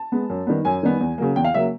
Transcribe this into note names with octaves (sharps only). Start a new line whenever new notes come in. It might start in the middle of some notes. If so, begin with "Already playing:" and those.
Already playing: A5
G#3 B3
F#2
D#3 G3 B3
F#2 G#5
D#3 G3 B3
E2
C#3 F#3 A#3
E2 G5
F5
C#3 F#3 A#3 E5